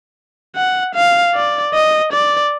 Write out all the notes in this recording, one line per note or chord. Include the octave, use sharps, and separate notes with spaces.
F#5
F5
D5
D#5
D5